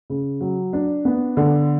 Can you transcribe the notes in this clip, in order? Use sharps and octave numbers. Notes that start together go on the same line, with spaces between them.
C#3
F#3
D4
B3
D3